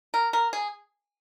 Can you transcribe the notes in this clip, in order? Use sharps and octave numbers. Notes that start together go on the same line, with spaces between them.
A#4
A#4
G#4